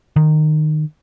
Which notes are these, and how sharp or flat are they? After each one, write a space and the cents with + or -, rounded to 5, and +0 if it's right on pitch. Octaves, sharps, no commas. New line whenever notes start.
D#3 -20